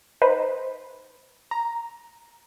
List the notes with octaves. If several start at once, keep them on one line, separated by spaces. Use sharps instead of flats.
D#4 B4 C5
A#5